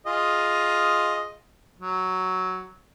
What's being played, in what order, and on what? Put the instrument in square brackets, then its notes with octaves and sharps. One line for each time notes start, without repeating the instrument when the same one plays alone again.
[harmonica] F4 G#4 D#5
F#3